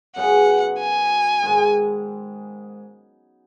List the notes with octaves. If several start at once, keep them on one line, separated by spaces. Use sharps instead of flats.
F#2 C#3 B3 F#5
G#5
G#2 D#3 G#3